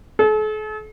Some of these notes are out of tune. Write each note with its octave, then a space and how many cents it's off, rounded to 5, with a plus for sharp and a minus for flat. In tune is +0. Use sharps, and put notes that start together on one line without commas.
A4 -45